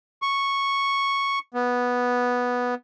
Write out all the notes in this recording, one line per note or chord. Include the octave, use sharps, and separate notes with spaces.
C#6
B3